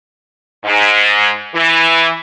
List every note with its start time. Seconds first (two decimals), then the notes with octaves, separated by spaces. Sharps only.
0.64 G#2
1.55 E3